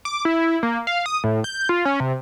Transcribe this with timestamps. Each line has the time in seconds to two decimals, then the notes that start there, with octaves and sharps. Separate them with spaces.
0.05 D6
0.25 E4
0.63 A#3
0.87 F5
1.06 D#6
1.24 A2
1.44 G6
1.69 F4
1.85 C#4
2.00 C3